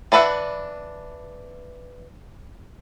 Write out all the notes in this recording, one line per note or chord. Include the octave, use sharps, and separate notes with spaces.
E3 D4 B4 E5 F#5